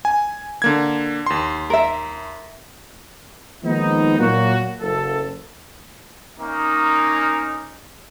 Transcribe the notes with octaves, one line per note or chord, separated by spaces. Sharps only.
G#5
D3 A#3 G#6
D#2 C6
A#4 E5
D#3 F3 G#3 A#3 B3 D#4
A#2 F#3 A#3 F#4
F#1 A4
A#3 C#4 D#4